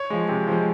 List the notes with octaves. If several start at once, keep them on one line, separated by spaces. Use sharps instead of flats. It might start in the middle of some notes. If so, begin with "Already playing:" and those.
Already playing: C#5
F3 G#3
C3
F3 G#3